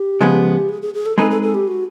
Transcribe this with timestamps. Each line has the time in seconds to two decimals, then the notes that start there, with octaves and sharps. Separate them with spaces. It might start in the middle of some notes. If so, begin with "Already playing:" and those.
Already playing: G4
0.21 C#3 F3 G#3 B3
0.69 G#4
0.82 G#4
0.94 G#4
1.06 A4
1.18 G#3 C4 D#4 G#4 A4 B4
1.30 A4
1.42 A4
1.54 G4
1.67 F#4